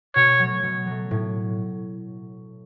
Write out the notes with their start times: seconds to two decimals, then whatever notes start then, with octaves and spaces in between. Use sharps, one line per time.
0.15 B2 C#5
0.39 F#3 A3
0.63 B2
0.87 F#3 A3
1.11 A2